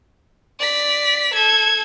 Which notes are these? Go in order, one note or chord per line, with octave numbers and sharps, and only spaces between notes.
D5 B6
A4 G#6